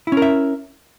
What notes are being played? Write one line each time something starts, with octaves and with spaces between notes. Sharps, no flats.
C#4 E4 A#4 E5